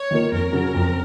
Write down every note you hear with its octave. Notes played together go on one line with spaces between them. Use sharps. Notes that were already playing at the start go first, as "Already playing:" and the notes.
Already playing: C#5
D#3 A#3 F4 A#4
F2 A#4
C#3 F#3
F2